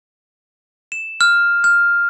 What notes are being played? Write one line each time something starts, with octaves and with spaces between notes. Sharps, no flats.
E7
F6
F6